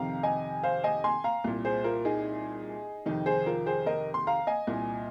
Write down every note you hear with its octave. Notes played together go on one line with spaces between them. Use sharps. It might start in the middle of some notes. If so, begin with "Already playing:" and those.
Already playing: F2 C3 D#3 F5 A#5
D#5 G#5
C5 F5
D#5 G#5
G#5 C6
F5 A#5
C2 A#2
G#4 C5
F4 A#4
D#4 G#4
F2 C3 D#3 D#4
G#4 C5
F4 A#4
G#4 C5
A#4 D#5
C6
F5 A#5
D#5 G#5
C2 A#2